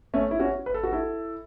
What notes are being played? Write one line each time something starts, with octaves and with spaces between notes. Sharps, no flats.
A3 C#4
E4
C#4 F#4
B4
A4
F#4
E4 A4